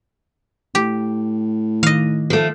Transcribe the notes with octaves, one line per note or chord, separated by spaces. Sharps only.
A2 G4
D#3 D#5 F5
F3 A3